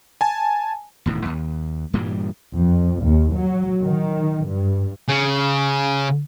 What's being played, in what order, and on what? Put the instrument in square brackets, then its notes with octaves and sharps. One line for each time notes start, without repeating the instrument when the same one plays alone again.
[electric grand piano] G#5 A5
[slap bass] E1 A2 D#3
D#2
G2 A#2 E3 G3
[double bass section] F2
D#2
F#3
D#3
G2
[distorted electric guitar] C#3